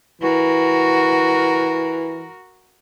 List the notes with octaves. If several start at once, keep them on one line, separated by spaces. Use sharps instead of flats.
E3 F#4 A#4